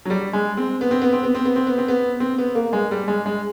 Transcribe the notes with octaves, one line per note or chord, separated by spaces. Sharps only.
F#3
G3
G#3
C4
B3
C4
B3
C4
B3
C4
B3
C4
B3
C4
B3
C4
B3
A#3
G#3
G3
G#3
G#3